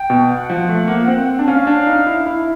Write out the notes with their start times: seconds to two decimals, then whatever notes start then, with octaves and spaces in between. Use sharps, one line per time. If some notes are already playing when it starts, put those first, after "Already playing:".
Already playing: G5
0.10 B2
0.30 F#5
0.50 F3
0.69 A3
0.88 A#3
1.08 C4
1.39 D4
1.48 C#4 F5
1.67 D4
1.87 D#4
2.07 E4
2.26 E4